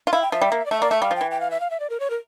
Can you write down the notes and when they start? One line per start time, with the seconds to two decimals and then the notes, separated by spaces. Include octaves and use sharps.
0.07 F4
0.12 E4 F5
0.22 G5
0.32 F3 E5
0.41 G3
0.52 A#3
0.66 D5
0.71 A3 E5
0.81 A#3 D5
0.91 A3 E5
1.01 G3 F5
1.11 F3
1.16 E3 G5
1.31 G5
1.41 F5
1.51 E5
1.60 F5
1.71 E5
1.80 D5
1.90 A#4
2.00 C#5
2.10 A#4